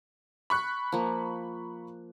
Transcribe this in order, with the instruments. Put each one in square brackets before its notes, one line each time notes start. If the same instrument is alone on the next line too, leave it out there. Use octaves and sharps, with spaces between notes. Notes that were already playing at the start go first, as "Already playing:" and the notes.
[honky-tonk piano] B5 C#6 F#6
[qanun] F3 A#3